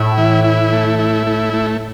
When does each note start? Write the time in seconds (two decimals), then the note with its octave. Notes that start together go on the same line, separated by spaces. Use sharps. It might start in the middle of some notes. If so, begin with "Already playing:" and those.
Already playing: A2 E4
0.18 E3
0.44 E4
0.73 A3
0.99 E4
1.27 A3
1.54 A3